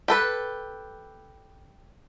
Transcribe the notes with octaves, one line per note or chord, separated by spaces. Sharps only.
G4 A4 B4